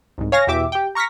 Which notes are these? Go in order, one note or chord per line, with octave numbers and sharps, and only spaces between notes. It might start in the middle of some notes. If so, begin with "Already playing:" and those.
C2 G#2
C#5 F5 G#5 A#6
E2 B2 G4 E5 D6
G4 G5
A#5 C#6 F6 A#6 B6